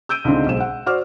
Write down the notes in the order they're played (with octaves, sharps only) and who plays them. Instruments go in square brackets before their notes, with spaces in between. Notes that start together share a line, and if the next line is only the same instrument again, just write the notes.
[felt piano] E6 G6 D7 D#7
C#2 D3 G#3 C4 D#4
B1 G#3 C5 E7
F#5
F#4 C5 D5 D6 F6